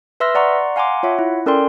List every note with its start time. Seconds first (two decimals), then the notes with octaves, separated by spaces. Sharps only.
0.20 B4 E5 C6 E6 F6 A#6
0.35 D5 F#5 A#5 C6 C#6
0.76 F5 F#5 G#5 A#5 C6 D6
1.03 F4 C#5 E5 F#5
1.19 E4
1.46 C#4 A4 A#4 D5 G5 C6